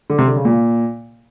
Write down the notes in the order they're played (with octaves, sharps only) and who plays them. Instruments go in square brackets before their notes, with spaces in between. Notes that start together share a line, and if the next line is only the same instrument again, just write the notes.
[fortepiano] D3
C3
D3
C#3
A#2